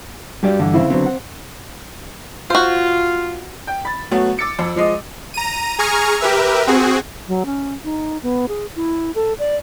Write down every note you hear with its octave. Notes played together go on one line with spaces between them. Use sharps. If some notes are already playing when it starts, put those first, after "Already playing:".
G2 F#4 G4 D5
G2 D3 E3
C#3 C4 E4
D3 F#3 B3 C4
F#5
F4 F#4 C5
G5
B5 A6
F#3 A3 B3 F#4
D6 E6 A6 C#7 D7
F2
F3 G#3 D#5
A#5 D#7
G#4 G#5 A#5 C#6 F6
G4 A#4 B4 E5
C4 F#4 G#4
F#3
C#4
D#4
B3
G#4
E4
A4
D5